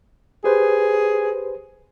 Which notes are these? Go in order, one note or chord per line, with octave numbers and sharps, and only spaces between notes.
G4 G#4 B4 C5